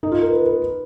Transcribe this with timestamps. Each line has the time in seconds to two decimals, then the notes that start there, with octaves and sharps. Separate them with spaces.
0.03 D#4
0.12 F4
0.22 A#4
0.31 B4
0.46 B4